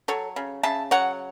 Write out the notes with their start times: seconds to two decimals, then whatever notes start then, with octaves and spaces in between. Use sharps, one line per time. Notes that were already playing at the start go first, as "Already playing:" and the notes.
0.08 F#3 A4 C#5
0.36 C#3
0.63 C#3 E5 A5
0.91 F#3 C#5 F#5